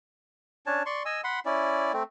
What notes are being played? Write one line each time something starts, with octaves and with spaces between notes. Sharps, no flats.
C#4 D4 C#5 A5
D5 C6 C#6
D#5 G#5 E6
F#5 B5 C6
C#4 E4 D5
A3 C4